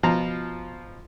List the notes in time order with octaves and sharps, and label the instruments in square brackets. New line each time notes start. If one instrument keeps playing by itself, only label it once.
[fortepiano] B2 F3 F4 A#5